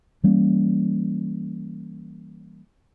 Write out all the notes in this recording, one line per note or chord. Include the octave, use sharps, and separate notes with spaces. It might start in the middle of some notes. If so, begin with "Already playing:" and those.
E3 G3 A#3 C#4